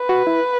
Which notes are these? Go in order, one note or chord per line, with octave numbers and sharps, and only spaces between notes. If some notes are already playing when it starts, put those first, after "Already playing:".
Already playing: B4
F#4
E4